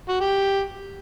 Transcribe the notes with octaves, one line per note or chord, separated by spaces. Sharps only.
F#4
G4